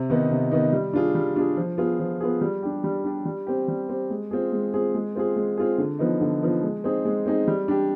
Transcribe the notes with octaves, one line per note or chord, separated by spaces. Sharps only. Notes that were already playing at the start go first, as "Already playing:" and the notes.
Already playing: C3
D#3 B3 D#4
C3
D#3 B3 D#4
G3
D4 F4 G#4
G3
D4 F4 G#4
F3
B3 F4 G#4
F3
B3 F4 G#4
G3
D4 G4
G3
D4 G4
G3
C4 G4
G3
C4 G4
G#3
C4 F4 G#4
G#3
C4 F4 G#4
G#3
C4 F4 G#4
G#3
C4 F4 G#4
D3
F3 B3 D#4
D3
F3 B3 D#4
G#3
C4 D#4 G#4
G#3
C4 D#4 G#4
G3
D4 G4